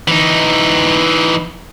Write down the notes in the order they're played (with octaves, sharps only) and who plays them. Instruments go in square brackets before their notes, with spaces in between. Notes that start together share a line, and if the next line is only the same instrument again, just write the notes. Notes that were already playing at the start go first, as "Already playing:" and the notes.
[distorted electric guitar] E3 D#4